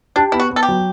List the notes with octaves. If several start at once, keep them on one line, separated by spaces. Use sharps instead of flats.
D4 G4
B3 E4
F#4
B3
A4
G4
F#3